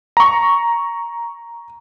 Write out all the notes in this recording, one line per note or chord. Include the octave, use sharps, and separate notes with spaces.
A#5 C#6